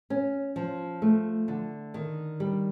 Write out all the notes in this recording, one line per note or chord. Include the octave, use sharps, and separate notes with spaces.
C#4
F3
A3
D3
D#3
G3